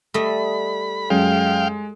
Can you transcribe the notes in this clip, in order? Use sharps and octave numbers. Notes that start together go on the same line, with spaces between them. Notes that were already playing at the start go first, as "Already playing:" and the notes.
G3 A3 D#5 B5
F#2 G#3 F5 G5